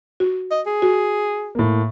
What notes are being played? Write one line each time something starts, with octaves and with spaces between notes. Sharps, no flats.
F#4
D#5
G#4
F#4
A2 A#3